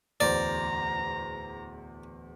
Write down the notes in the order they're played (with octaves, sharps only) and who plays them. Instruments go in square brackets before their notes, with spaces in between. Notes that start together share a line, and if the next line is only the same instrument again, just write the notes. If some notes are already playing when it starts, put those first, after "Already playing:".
[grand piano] D1 E2 C5 [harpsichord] D5 [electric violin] A#5